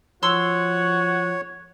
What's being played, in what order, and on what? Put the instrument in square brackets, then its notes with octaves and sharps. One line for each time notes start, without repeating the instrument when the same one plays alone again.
[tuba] F3 [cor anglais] F#4 [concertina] C#5 [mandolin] C6 E6